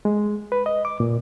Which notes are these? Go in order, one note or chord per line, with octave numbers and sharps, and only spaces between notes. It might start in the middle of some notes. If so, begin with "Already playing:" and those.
G#3
B4
D#5
D6
A#2